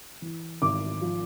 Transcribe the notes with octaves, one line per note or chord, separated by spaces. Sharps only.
E3
G#1 D6
F3